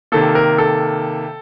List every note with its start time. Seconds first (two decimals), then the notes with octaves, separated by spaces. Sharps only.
0.12 C3 D#3 A#3 A4
0.35 A#4
0.58 A4